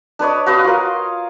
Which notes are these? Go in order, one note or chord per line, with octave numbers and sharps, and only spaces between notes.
D4 B4 C#5 D#5
F#4 B4 D#5 F5
F4 A#4